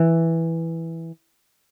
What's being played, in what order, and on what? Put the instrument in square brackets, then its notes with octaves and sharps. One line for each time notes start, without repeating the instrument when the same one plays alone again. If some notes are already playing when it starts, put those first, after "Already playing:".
Already playing: [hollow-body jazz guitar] E3